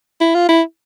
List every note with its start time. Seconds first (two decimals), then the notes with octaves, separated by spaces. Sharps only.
0.21 E4
0.35 F4
0.49 E4